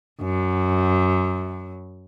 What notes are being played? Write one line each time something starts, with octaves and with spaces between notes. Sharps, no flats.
F#2